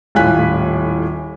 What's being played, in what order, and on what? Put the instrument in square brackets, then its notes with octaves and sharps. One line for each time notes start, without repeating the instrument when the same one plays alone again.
[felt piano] D#1 A2 F4 G#5 F#6 B6